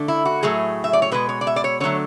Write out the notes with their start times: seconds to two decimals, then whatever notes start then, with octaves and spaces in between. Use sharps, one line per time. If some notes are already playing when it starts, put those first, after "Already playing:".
Already playing: D3 A3
0.08 E4
0.25 F#4
0.43 A2 F#3 A3 G#4
0.84 E5
0.93 D5
1.02 C#5
1.11 B2 G#3 B4
1.29 C#5
1.41 D5
1.47 E5
1.56 D5
1.64 C#5
1.80 D3 F#3 A3 C#5